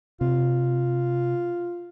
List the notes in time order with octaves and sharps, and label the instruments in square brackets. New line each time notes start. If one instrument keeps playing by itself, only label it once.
[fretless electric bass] C3 [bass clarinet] F4